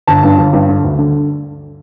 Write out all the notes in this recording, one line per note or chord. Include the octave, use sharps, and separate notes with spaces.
G1 A5
G2
G1
G2
D3
D2
D3